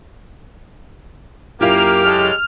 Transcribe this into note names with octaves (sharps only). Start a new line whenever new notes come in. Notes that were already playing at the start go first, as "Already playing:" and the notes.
F#2 A#3 E4 F4 G4 F6
C#3 G#3 A4